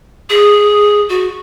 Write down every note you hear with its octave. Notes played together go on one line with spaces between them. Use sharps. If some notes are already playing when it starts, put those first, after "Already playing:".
G#4
F#4